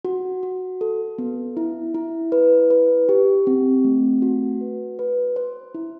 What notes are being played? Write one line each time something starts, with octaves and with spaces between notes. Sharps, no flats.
F#4
F#4
A4
B3
E4
E4
B4
B4
G4
C4
A3
F#4
B4
B4
C5
E4